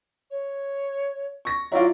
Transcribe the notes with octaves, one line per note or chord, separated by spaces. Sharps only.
C#5
C#6 A#6
F#3 E4 F4 D5